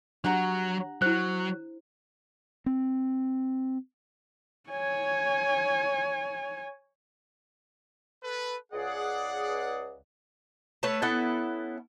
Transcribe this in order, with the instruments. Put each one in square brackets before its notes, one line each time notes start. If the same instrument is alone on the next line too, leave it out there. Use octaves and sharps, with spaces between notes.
[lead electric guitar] F#3 [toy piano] D4 G4 [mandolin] F#5 A#5
[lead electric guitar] F#3 [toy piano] E4 C5 [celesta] F#6
[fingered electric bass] C4
[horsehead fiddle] C#5 G#5
[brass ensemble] A4 B4
[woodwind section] C#2 G#4 [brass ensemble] D5 F#5
[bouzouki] A3 B4 C#5 A5
B3 C#4 E4 A4